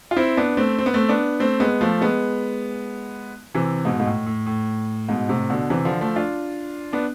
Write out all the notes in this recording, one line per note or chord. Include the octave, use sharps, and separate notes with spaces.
F4
C4 E4
B3 D4
A3 C4
C4
B3
A3 C4
B3 D4
A3 C4
G#3 B3
F3 A3
G#3 B3
C3 E3
G#2 B2
G#2
A2
A2
A2
G#2 B2
A2 C3
B2 D3
C3 E3
D3 F3
F3 A3
D4 F4
B3 D4